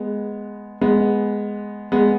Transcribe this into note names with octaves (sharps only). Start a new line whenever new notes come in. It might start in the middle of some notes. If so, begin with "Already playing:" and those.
Already playing: G#3 B3
G#3 B3
G#3 B3